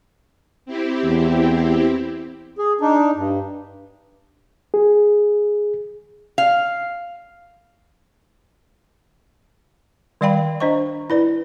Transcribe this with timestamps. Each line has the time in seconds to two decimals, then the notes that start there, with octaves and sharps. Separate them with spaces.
0.66 C4 E4 G4
1.04 E2
2.58 G#4
2.81 D4 D#4
3.16 G2
4.74 G#4
6.38 F5
10.21 D#3 G3 D5 F5 G5 B5
10.60 D4 C5 D#5 C#6
11.10 E4 B4 D5